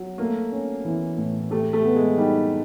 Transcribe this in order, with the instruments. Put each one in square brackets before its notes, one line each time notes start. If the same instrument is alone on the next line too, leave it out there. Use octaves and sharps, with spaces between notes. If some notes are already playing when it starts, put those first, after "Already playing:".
Already playing: [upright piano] F#3
[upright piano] A3 [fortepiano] A#3
[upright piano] C#4
E3
A2
[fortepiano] A3 [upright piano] G4
[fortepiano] A3
[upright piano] B3
[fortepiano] G#3
[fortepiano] G3 [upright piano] D#4